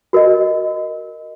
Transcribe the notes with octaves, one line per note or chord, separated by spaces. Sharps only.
F#4 A#4 D#5